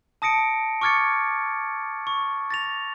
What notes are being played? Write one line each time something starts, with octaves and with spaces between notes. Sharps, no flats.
A5 D#6 A#6 C#7 D7
C#6 D6 F6 G#6 A6 C#7
C#6
A6 A#6 F7